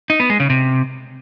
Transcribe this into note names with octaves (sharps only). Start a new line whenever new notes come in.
D#4
B3
G#3
C#3
C3